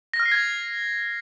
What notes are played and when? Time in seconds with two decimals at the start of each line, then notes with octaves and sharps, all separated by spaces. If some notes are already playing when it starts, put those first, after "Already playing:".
0.14 A#6
0.20 F6
0.26 C7
0.32 G#6